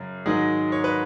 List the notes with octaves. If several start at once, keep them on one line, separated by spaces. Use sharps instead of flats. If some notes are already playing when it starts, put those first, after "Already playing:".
Already playing: F#2 C#3
G#2 D#3 F#3 G#3 G#4
C#5
B4